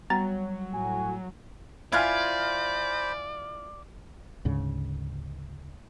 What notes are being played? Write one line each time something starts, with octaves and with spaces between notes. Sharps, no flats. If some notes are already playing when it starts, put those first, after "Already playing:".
F#3 G3 B3 A#5 A6
A2 F#4 G#5
E4 F4 C5 D5 G#5 B5 F6 G#6
D2 G#2 C#3